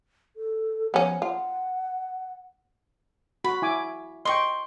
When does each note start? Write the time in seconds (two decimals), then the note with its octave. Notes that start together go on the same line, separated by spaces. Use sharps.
0.36 A4
0.94 F3 B3 C#4
1.22 F4 F#5
3.44 F#4 B5
3.62 E4 G#5 D6
4.25 D#5 G5 C6 C#6